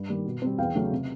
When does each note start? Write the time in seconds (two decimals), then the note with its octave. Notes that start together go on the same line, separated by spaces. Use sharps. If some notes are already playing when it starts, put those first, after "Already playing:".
Already playing: G2
0.09 D#3 G3 A#3
0.26 B2
0.42 G3 C4
0.58 E2 F5 G5
0.75 C#3 F#3 A3
0.92 C3